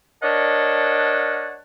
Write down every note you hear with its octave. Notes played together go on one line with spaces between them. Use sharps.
D4 A#4 C#5 D#5 F#5 A5